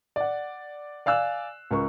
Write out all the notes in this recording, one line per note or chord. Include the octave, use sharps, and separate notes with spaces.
D5 F#5
D5 F5 G#5 E6 F#6
C#2 A#4 C#6